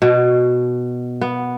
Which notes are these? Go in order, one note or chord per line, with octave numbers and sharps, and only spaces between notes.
B2
B3